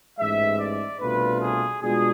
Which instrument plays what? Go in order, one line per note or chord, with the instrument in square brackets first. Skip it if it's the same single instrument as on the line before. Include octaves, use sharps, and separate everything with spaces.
[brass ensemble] A1 G#2 E3 G#3 E5
D5
C2 B2 A3 D4 F4 B4
G#4
B2 G#3 D4 F4 G#4